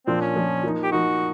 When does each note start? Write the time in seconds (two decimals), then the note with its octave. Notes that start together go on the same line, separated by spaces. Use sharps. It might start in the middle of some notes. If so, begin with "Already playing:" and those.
0.07 A#2 F3 A#3 C4 D4
0.21 C#4
0.36 A#2 F3 A#3 D4
0.64 F3 A#3 D#4
0.83 G4
0.92 F3 A#3 D#4 F#4